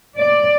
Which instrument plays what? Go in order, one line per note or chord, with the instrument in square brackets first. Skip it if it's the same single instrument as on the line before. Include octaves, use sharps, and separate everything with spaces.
[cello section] D5